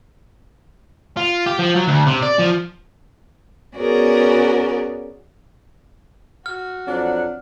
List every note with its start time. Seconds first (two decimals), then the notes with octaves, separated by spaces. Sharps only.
1.17 F4
1.46 G4
1.59 F3
1.76 F#3
1.88 D2
2.07 C3
2.23 D5
2.39 F3
3.76 B3 C#4 F#4 G#4 A#4 D5
6.46 F#4 F6
6.87 F2 F#3 D4 F#5